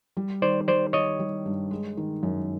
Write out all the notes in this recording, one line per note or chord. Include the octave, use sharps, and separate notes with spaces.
G3
D#3 C5 D5
G3 C5 D5
D#3 C#5 D#5
G3
G2
G#3
D#3
F#2